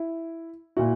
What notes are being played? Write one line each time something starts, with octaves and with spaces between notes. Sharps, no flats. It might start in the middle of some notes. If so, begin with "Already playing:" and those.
Already playing: E4
A#2 E4 F#4